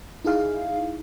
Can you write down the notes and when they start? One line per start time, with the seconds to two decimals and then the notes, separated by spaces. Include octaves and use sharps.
0.25 D#4 E4 G#4 F5